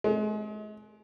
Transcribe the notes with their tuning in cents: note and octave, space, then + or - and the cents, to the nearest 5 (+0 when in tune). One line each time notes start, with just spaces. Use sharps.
G#3 +40